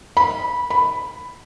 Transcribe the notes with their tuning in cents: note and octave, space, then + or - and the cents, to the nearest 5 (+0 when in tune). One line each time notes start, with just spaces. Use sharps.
B5 -15
B5 +5